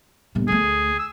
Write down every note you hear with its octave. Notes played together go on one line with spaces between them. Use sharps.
G1 A#2
D2 A3 G#4
E6